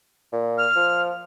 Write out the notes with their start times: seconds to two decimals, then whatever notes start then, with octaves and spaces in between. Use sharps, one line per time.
0.33 A#2
0.58 F6
0.76 F3